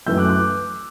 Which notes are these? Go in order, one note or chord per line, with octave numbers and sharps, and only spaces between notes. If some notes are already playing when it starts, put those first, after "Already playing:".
F#2 E3 A3 E6 G6
D6 F#6
D6 F#6